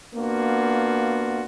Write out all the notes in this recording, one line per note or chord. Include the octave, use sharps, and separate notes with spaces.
A#3 B3 D4 F4 F#4